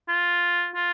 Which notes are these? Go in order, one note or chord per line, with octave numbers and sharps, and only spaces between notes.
F4
F4